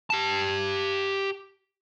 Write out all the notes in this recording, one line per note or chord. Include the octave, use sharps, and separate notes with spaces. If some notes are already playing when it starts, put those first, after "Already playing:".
G4 A5